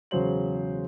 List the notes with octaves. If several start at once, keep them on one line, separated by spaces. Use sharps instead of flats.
E1 C#3 F#3 C5 F#7